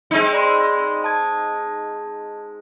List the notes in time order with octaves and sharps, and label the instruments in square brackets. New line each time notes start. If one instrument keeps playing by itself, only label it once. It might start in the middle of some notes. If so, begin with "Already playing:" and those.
[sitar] G#3 C4 D#4
[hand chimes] D5 B5 C6
A5 D#6 G#6